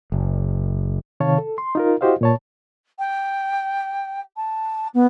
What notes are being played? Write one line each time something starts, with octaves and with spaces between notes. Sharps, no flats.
F#1
C3 D#3 C#5 F5 A5
A4
C6
D#4 F4 A#4
E4 F#4 G4 C5 D#5 F5
A#2 C#5 A5
G5
A5
B3